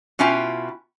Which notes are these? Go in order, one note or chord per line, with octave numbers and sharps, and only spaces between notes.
B2 C#4 E4 F4 G5